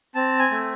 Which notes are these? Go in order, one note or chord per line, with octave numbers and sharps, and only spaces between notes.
C4 A5
G#5
A3